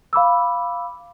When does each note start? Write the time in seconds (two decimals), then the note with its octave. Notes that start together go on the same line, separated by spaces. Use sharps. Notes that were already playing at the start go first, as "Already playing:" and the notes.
0.13 F5 B5 D6 E6